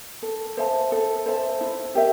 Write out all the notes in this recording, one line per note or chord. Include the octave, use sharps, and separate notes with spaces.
A4
C5 E5 A5
A4
C5 E5 A5
E4
G4 A#4 E5